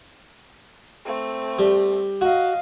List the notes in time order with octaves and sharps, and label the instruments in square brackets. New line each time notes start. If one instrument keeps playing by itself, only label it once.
[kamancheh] A3 C4
[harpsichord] G3
[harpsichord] F#4 [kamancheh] D#5 F5